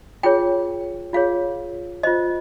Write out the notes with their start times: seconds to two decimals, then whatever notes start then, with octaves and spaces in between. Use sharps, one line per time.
0.23 F4 G#4 C#5 G5
1.13 F4 G#4 C#5 F5
2.03 F4 C5 D#5